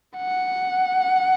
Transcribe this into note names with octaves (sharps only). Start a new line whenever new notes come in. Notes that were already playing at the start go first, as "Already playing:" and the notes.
F#5